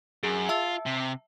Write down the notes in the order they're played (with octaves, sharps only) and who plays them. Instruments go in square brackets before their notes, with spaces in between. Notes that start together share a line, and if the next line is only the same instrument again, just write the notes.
[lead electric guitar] F#2 [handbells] G#4
[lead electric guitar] F4 [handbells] E5 A5 E6
[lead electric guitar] C3